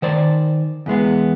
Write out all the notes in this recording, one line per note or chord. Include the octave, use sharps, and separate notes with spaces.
D#3 C5 D5
E2 E3 G#3 B3